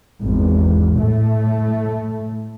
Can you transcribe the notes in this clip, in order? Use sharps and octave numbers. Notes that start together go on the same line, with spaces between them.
G#1 E2
A2 A3